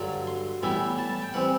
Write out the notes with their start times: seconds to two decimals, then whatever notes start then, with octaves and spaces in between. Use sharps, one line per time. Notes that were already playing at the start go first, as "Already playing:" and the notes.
Already playing: G2 D3 F#3
0.27 C6
0.63 A2 E3 G3 B3 E4
0.98 A5
1.09 A5
1.22 G5
1.34 E3 G3 C4 F#5